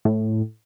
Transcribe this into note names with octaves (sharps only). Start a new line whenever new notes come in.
A2